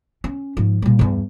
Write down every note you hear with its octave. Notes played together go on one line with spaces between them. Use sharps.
C#4
G#2 F3
A#2 G3
E2 G2